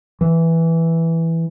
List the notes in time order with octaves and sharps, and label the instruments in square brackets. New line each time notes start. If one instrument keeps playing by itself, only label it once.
[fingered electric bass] E3